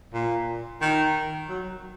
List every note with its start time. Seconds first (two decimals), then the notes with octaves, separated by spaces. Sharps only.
0.14 A#2
0.82 D#3
1.49 F#3